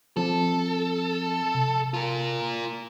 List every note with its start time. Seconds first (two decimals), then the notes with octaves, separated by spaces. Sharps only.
0.17 F3 C4 A4 A5
1.55 C3
1.94 F4 A#4